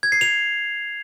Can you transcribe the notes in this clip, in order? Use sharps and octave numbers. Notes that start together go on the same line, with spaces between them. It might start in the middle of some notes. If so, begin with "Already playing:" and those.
G#6
C7
F7